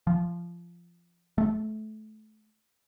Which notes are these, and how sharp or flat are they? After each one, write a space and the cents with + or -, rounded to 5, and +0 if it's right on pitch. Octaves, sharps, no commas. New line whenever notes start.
F3 -15
A3 -25